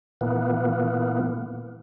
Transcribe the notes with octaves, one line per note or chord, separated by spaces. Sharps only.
A#2 E3 A#3 B3